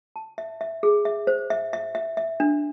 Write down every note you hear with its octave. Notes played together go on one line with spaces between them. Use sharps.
A5
E5
E5
G#4
E5
C5
E5
E5
E5
E5
D4